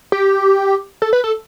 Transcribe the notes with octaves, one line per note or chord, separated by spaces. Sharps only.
G4
A4
B4
A4